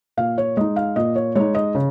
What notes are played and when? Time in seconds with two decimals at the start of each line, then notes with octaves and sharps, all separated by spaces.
0.17 A#2 F5
0.38 C#5
0.57 G#3 D#4 D#5
0.76 F5
0.96 A#2 D#5
1.16 C#5
1.35 G#3 D#4 C#5
1.55 D#5
1.75 C#3